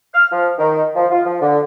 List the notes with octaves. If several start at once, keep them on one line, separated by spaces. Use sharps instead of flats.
F6
F3
D#3
F3
F4
F3
D3